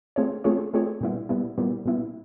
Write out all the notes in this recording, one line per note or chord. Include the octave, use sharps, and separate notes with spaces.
A3 C4 F4 G#4 C#5
A3 C4 F4 G#4 C#5
A3 C4 F4 G#4 C#5
A#2 G3 B3 E4
A#2 G3 B3 E4
A#2 G3 B3 E4
A#2 G3 B3 E4